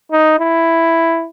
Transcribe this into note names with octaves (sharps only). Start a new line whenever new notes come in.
D#4
E4